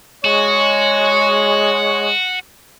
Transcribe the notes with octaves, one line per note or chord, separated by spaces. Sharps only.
G#3 F#4 C#5